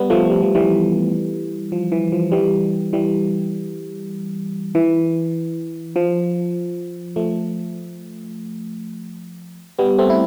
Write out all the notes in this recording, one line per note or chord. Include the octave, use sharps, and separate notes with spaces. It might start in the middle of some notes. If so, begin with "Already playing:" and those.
Already playing: G3 B3
F3 A3
G3
F3
E3 G3
F3
E3
F3
E3 G3
E3 G3
E3
F3
F3 A3
G3 B3
A3 C4
E4